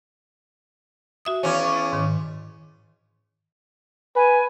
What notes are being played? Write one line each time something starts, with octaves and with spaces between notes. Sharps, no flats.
F#4 E5 D#6
E2 C#4
G#2 D#3
B4 G#5